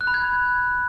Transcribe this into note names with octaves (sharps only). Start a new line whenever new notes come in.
F#6
B5
G#6